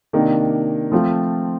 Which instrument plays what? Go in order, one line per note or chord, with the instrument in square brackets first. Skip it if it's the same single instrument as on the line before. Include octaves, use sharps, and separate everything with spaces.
[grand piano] C3 D#3 A#3 D4
F3 A3 C4 F4